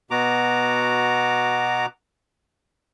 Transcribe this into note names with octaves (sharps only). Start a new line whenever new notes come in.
B2 B3 F#4 A#5 D6